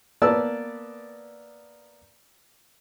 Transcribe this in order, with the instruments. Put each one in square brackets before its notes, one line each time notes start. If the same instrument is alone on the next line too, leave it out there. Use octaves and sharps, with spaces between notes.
[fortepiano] A#3 B3 B4 D5 A5 E6